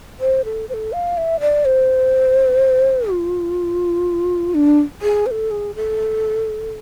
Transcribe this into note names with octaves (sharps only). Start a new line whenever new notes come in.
C5
A4
C5
A4
F5
E5
D5
C5
F4
D4
G#4
C5
A4
G#4
A4